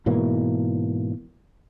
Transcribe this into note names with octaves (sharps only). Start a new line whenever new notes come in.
G#2 B2 E3 A#3